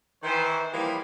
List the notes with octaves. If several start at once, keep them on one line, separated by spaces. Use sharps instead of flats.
D#3 E3 C5
E3 F3 G3 A#3 G4 G#4